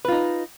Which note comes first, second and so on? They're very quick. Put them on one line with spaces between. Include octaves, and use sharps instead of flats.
B4 F4 D#4